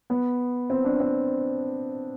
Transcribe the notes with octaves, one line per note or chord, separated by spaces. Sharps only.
B3
C4
D4
C4